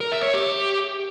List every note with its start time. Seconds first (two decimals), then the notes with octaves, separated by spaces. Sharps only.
0.01 A#4
0.12 E5
0.23 C#5
0.34 G4